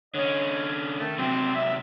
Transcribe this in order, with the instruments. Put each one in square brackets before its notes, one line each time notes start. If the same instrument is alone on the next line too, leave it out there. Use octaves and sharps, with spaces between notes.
[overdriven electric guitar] D3 C#4 [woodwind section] C#5 D#5
[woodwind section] D#3 A3
[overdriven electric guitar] C3 F#3 [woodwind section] C4
[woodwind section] E5